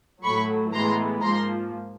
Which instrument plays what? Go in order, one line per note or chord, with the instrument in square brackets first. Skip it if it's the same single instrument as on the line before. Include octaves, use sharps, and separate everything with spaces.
[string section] A2 F#3 A3 B5 C#6
A2 E3 G#3 B3 A#5 C6
G#2 F3 A#3 A#5 C6